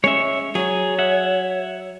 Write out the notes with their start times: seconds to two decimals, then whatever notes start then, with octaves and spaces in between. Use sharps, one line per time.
0.04 G#3 C#4 C#5 E5
0.55 F#3 G#4 C#5
0.99 E5 F#5